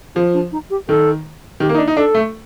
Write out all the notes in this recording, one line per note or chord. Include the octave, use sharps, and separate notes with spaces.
F3 F4
D4
D#4
G4
D#3 A4
D#3 G4
A#3
D#4
D4
D#4
D4 A4
A3